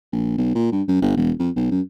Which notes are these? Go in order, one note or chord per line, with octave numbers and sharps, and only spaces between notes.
A#1
B1
A#2
G2
F#2
G1
E1
F2
B1
F#2